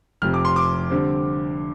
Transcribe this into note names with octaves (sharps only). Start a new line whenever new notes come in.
F1 F2 C3 F6
D6
C6
D6
D3 G3 C4